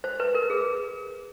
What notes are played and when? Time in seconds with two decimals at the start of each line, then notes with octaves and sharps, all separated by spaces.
0.04 C5
0.20 B4
0.35 A#4
0.50 G#4